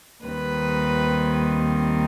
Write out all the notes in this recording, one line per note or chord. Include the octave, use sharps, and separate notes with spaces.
D#2 D#3 G3 C4 B4